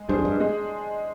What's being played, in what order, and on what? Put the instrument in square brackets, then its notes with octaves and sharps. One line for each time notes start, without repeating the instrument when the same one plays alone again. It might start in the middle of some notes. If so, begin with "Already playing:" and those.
Already playing: [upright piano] G#3
[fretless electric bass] G2 [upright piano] D4 G#4 C5
[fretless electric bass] F2
G2
[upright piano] G#3